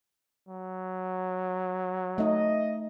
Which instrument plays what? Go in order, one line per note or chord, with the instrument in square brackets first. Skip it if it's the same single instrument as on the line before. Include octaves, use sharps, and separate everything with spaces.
[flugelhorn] F#3
[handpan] A3 D#4 [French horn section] D#5